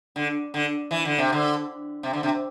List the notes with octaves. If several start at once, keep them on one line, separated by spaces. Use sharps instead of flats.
D3
D3
E3
D3
C3
D3
C3
D3
C3